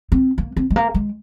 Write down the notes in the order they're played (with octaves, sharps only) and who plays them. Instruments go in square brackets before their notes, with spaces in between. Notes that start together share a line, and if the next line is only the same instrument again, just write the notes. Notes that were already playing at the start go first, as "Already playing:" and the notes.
[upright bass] C4
A#3
C4
G#3
A#3
G#3